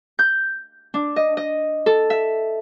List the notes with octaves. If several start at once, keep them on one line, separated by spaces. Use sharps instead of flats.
G6
D4
D#5
D#5
A4
E5